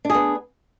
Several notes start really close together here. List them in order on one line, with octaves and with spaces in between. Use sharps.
D4 G#4 B3